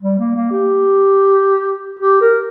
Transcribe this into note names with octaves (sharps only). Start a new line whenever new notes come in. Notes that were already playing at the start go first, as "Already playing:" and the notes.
G3
A#3
A#3
G4
G4
A#4